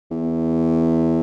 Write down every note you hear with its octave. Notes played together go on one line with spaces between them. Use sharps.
E2